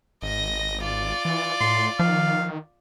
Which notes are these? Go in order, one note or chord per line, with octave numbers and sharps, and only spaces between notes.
G#1 D#5 A#6
F4 D5
E3
A2 C6
D#3 F3 F5